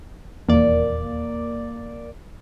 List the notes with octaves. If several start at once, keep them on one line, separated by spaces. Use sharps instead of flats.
D#1 E2 A#3 D5